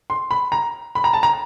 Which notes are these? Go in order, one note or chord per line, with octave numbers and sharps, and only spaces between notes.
C6
B5
A#5
B5
A#5
A5
A#5